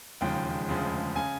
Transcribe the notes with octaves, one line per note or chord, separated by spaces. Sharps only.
E1 D#2 C#3 F3 G#3 G5
E1 D2 C#3 F3 G#3
C#3 G#5